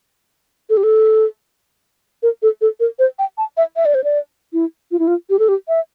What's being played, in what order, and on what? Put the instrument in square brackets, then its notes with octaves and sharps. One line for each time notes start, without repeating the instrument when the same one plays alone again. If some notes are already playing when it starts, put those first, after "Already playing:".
[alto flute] A4
G4
A4
A#4
A4
A4
A#4
C5
G5
A5
E5
E5
D5
C5
D5
E4
F4
E4
F4
G4
A4
G4
E5